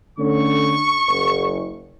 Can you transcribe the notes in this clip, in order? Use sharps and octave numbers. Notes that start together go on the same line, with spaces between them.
D3 A3 C#4 C#6
F#1